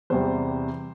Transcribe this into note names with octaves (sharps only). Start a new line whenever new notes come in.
E2 C3 G3 C5